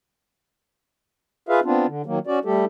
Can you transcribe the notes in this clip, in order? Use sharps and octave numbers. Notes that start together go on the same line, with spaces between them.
F4 G#4 B4 E5 F5
B3 C4 D4 F4
D3
D#3 F#3 A#3
C#4 F#4 D5
G3 A3 G4 A4